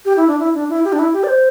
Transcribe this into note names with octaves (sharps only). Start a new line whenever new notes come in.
G4
E4
D4
E4
D4
E4
G4
D4
E4
G4
D5
C5